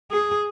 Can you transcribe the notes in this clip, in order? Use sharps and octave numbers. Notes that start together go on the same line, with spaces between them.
G#4